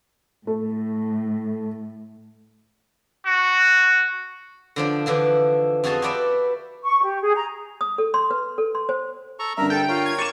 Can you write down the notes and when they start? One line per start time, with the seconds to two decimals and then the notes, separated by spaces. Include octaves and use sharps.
0.47 A2 A3
3.26 F#4
4.76 D3 F3 D4
5.06 D3 E3 F3
5.84 F2 F#4 G#4 D#5 A5 C6
6.02 F#4 G4 B4 D5 E5
6.83 C#6
7.02 G4
7.21 G#4
7.35 A#5
7.81 D#6
7.98 A4
8.14 C6
8.31 B4
8.58 A4
8.75 C6
8.89 C5
9.39 A4 A#5 C#6
9.57 G2 D3 A#4 E5 A#5
9.70 A4 G5
9.89 F4 A#4 C#5
10.06 G#6
10.19 C#6 D6 A6 D#7 E7